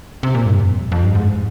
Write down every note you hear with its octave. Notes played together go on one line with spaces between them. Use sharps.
C3
A#2
G2
F2
F2
G2
G#2